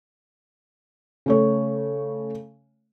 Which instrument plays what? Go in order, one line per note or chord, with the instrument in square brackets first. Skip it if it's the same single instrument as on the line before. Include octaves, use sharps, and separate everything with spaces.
[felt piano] C#3 A3 C#5